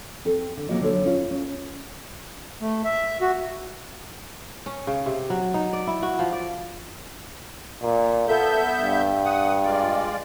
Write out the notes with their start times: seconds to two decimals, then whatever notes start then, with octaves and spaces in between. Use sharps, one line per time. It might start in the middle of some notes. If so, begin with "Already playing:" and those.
0.25 C4 A4
0.57 D3
0.69 C3 F#3 A#3 F4 F#4 D#5
0.81 D3 F#3 B3 D4 A4 C#5
1.05 C#4 F4
1.31 C#4
2.61 A3
2.85 E5
3.21 F#4
4.66 C#4
4.87 C#3
5.06 C3
5.30 F#3
5.54 D#4
5.73 D5
5.87 E4
6.03 F#4
6.19 F3
6.33 D5
7.83 A#2
8.28 B3 A4 E5 G6
8.80 G2
9.25 F#5 D#6
9.64 G#3 F4 D5